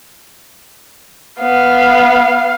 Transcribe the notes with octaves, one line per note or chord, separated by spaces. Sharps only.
B3 F5